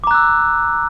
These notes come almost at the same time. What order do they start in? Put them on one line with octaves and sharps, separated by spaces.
D6 A#5 F#6 E6